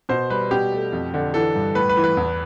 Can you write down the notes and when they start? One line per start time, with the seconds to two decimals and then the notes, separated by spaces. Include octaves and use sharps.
0.09 B2 C5
0.30 G3 B4
0.51 B2 G4
0.72 A3
0.92 F2
1.14 D3
1.34 E3 A4
1.55 G2
1.75 A2 B4
1.89 B4
1.97 E3
2.04 B4
2.17 E2